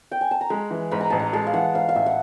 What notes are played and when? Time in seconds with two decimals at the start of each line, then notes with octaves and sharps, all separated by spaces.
0.11 G5
0.21 G#5
0.31 A5
0.41 A#5
0.50 G#3 B5
0.71 E3
0.91 G#2 B5
1.01 A#5
1.10 A1 A5
1.19 A#5
1.33 G#3 A5
1.47 F5
1.53 E3 F#5
1.75 G#2 F5
1.89 F5
1.95 A1 E5
2.06 F#5